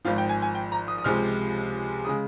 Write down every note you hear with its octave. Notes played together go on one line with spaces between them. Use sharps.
G#1 G#2 F3 F5
G5
G#5
G#5
G5
A#5
D#6
D#6
C#2 C3 F3 G#3 F6
C#3 G#3 D#6